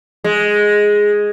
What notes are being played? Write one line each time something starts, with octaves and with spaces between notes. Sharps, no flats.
G#3